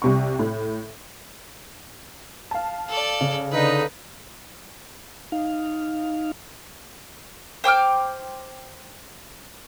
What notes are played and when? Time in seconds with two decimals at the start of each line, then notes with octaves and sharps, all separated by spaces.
0.02 C2 C3 C#6
0.39 A2
2.51 F5 A5
2.89 A4 D5
3.21 C#3
3.52 D3 D#4 B4
5.32 D#4 F5
7.64 C5 G5 D6 F6